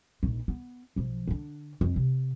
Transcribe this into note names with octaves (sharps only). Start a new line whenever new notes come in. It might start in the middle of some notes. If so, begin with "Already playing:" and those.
A#1 D#4
B3
B1 F3
D3 D4
F2
C3